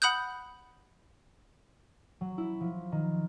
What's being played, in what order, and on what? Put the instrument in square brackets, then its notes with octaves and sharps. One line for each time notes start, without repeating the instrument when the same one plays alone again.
[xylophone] F#5 B5 D#6 F#6 G6
[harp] F#3
E4
F3
D#3